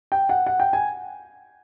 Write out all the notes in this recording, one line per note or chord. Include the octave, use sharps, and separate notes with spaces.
G5
F#5
F#5
G5
G#5